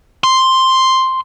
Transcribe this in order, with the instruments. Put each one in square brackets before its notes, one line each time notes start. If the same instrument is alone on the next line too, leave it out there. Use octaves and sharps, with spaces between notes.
[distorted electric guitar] C6